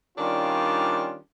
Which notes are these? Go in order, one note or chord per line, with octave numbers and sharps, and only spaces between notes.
D#3 G3 C#4 D4 F4